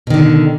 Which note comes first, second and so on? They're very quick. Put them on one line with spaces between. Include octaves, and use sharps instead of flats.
B2 D#3 D3